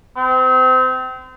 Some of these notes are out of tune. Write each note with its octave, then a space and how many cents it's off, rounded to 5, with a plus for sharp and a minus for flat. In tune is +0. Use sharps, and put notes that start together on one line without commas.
C4 -30